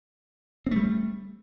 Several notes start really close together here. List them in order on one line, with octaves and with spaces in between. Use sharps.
C4 A3 G3